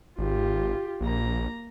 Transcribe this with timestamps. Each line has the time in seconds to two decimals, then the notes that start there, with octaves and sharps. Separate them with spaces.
0.18 G#1 F4 G4
1.01 A#1 A#3 A#5